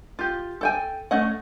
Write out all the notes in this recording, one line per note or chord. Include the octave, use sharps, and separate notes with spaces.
F4 G4
A4 G5 G#5
A3 C#4 D#5 F#5